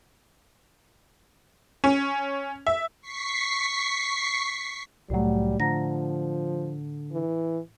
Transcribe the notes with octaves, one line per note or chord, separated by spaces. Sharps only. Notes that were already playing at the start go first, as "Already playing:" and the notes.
C#4
E5
C#6 B6 C7
C2 A2 F#3 G3 A3
D3 F3 A#5 A#6
E3